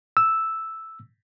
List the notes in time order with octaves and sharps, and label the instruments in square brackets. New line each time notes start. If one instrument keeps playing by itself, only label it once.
[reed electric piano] E6